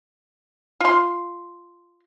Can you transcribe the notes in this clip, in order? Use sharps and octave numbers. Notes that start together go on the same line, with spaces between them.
F4 C6